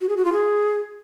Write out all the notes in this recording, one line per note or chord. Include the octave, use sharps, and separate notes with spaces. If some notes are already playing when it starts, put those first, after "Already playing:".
F#4
G#4
F#4
F4
G#4